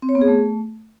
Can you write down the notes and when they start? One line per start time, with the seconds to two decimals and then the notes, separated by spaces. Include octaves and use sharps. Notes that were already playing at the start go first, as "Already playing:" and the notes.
0.02 C4
0.09 C#5
0.15 B3
0.21 G#4
0.28 A3